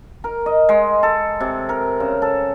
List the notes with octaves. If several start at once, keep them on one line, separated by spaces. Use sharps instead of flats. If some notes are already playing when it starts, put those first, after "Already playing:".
A#4
D#5
G#3
A4
C3
A#4
C#3
A4